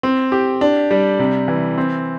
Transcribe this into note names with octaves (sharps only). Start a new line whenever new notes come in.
C4
G4
D4
G3
C3
E3
C4